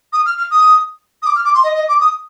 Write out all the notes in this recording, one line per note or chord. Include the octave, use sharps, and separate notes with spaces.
D#6
F6
F6
D#6
D#6
D6
F6
D6
C6
D#5
D#5
D6
D#6